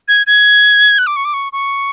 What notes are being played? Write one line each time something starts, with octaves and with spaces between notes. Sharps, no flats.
G#6
G#6
F#6
D6
C#6
D6
C#6
C#6